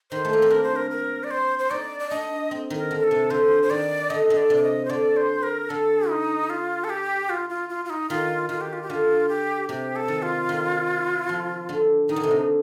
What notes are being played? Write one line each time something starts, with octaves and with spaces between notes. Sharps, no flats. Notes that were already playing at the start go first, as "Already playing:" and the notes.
D#3 C5
A3
A#3
C4
D4 A#4
C5
A#4
A#4
D5
C5
C5
D#4 D5
D5
D4 D#5
C4
D#3
A#4
D3
A#4
A4
C3
D3 C5
C5
D#3 D5
D3 D#5
D3
D5
C3
D5
D#5
C5
D3 D5
C5
A#4
D3 A4
D#4
F4
A4
G4
F4
F4
F4
F4
D#4
D#3 F4
D#3 F4
G4
F4
G4
D3 F4
G4
C3 G4
A4
D#3
F4
D#3
F3
D3
D#3 D#4
D3
C3
D3